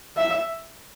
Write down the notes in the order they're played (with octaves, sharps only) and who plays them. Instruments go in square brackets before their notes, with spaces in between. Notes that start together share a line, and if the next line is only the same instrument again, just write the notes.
[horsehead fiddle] E5